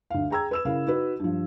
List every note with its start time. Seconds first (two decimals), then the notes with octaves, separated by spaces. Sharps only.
0.10 D2 F5
0.30 G#4 G5 A#5 E6 G#6
0.51 B4 E6 E7
0.65 C#3 E4 A#4 F5
0.87 D#4 F#4 B4
1.20 G2 F3